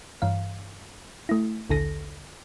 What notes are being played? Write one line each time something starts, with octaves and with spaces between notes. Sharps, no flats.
G2 E3 F5
A3 E4
A#1 D#2 D3 A4 A#6